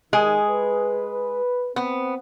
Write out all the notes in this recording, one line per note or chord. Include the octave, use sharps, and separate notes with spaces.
D#3 G#3 D#4 G#4
B4
B3 C4